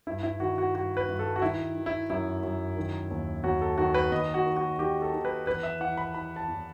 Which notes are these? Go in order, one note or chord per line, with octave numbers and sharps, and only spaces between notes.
G2 E4
E4
D#3 F#4
F#4
G2 F#4
B4
G2
A4
F#4
D#3 E4
D#3
E4
F#2 E4
F#2
D#3
D#2
D#2 F#4
A4
D#3 F#4
B4
D#2 D#5
F#4
D#3
F#4
D#3 G4
A4
D#3
B4
E2 B4
E5
E3 F#5
B5
E3 B5
A5
E2